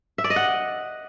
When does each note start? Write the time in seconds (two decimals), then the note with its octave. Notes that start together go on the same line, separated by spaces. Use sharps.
0.18 E5
0.24 D5
0.30 D#5
0.36 F#5